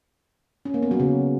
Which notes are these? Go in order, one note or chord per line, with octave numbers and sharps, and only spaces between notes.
C#4
A#3
B3
F#3
C#3